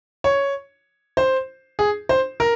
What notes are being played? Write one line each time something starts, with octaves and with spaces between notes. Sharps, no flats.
C#5
C5
G#4
C5
A#4